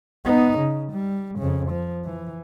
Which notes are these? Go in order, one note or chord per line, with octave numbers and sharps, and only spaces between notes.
B3 D#4
C#3
G3
F2 C#3
F3
E3